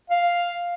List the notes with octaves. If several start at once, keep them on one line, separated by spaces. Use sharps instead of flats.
F5